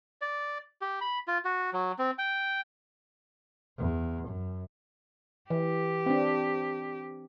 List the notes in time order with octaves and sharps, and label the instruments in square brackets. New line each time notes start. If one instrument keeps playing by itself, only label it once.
[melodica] D5
G4
B5
F4
F#4
F#3
C4
G5
[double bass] E2
F#2
[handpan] E3 [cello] G4
[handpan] C4 D4